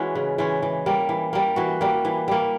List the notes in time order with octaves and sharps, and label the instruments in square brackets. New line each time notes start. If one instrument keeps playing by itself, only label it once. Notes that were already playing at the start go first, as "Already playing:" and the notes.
Already playing: [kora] E3 G#3 C#4 F#4 G#4
C#3
E3 G#3 C#4
E3
G3 A#3
E3
G3 A#3
E3 F#4
G3 A#3
E3
G3 A#3